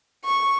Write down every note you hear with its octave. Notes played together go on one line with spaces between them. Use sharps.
C#6